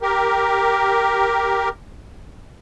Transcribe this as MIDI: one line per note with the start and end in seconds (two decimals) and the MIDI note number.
0.01 1.69 67
0.01 1.69 70